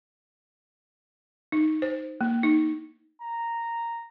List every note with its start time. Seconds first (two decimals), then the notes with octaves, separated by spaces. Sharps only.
1.52 D#4
1.82 C5
2.21 A#3
2.43 D#4
3.22 A#5